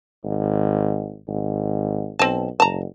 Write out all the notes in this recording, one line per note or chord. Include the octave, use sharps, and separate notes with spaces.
G#1
G#1
B1 C4 A5
F#1 A5 A#5